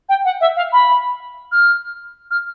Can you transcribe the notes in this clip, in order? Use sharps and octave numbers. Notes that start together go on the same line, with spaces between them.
G5
F#5
E5
F5
B5
F6
F6